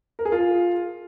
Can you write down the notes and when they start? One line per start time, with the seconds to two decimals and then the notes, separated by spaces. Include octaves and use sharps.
0.19 A#4
0.25 G#4
0.32 F4